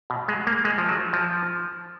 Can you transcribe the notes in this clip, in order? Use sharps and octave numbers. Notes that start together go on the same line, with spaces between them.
B2
G#3
A#3
G#3
F3
F#3
F3